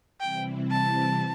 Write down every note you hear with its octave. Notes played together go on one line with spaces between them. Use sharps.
C3 E3 G3 C4 E4 G5
A5